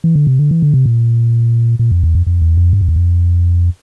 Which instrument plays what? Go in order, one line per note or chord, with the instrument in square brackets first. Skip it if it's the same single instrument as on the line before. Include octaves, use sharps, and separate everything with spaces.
[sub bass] E3
D3
C3
D3
E3
D3
C3
A#2
A#2
F2
E2
F2
F2
E2
F2
G2
F2
E2
F2